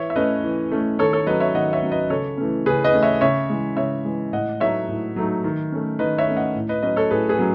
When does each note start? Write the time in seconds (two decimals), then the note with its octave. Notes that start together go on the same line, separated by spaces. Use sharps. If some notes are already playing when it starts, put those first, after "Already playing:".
Already playing: E3 C#5 E5
0.10 E5
0.16 A3 C#4 B4 D#5
0.44 E3
0.71 A3 C#4
0.99 D#3 A4 C#5
1.13 A4 C#5
1.27 F#3 C#4 B4 D#5
1.40 C#5 E5
1.54 D#3 D#5 F#5
1.73 C#5 E5
1.83 F#3 C#4
1.91 B4 D#5
2.10 C#3 A4 C#5
2.37 E3 A3 C#4
2.66 C#3 G#4 B4
2.84 B4 D#5
2.94 E3 A3 C#4
3.03 C#5 E5
3.21 C#3 C#5 E5
3.50 E3 G#3
3.77 C#3 C#5 E5
4.05 E3 G#3
4.32 A2 D#5 F#5
4.60 F#3 A3 D#4 C#5 E5
4.88 A2
5.16 F#3 A3 D#4
5.44 D#3
5.72 A3 C#4
5.99 D#3 B4 D#5
6.18 C#5 E5
6.27 A3 C#4
6.36 D#5 F#5
6.55 A2
6.69 B4 D#5
6.83 F#3 C#4 B4 D#5
6.96 A4 C#5
7.11 A2 G#4 B4
7.29 G#4 B4
7.39 F#3 C#4